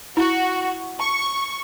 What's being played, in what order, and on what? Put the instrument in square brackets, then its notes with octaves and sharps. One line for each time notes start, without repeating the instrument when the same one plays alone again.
[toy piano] E4 [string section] F#4
[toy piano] A5 [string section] C#6